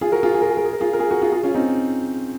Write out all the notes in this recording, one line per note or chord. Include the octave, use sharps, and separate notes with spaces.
F4 G#4
F#4 A#4
F4 G#4
G#4
A#4
G#4
A#4
G#4
A#4
F4 G#4
A#4
F4 G#4
F#4 A#4
F4 G#4
F4 G#4
C#4 F4
C4 D#4